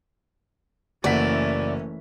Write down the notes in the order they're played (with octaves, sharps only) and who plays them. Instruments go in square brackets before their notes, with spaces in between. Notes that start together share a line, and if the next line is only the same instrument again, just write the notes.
[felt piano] F#1 F#5 B6 [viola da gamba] E3 A3 C#4 [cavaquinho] D5